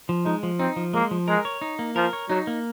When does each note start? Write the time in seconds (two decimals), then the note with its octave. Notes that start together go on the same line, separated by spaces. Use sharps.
0.09 F3
0.25 G#3 D#4
0.43 F3
0.60 C4 D#4
0.76 F3
0.93 G#3 A#3
1.11 F3
1.28 G#3 A#4
1.45 C#5
1.62 D#4
1.79 A#3
1.96 F3 A#4
2.13 C#5
2.29 F#3 D#4
2.47 A#3